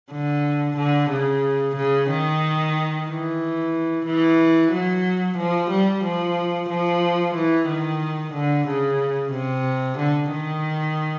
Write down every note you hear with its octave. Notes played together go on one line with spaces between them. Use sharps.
D3
D3
C#3
C#3
D#3
E3
E3
F#3
F3
G3
F3
F3
E3
D#3
D3
C#3
C3
D3
D#3